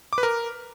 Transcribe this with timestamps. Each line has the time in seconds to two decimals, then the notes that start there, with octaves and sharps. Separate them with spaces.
0.13 D6
0.18 B4
0.23 A#4